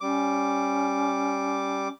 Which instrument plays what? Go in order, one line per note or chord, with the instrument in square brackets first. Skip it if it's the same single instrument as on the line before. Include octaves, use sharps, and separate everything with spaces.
[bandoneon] G3 D6 [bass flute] C#4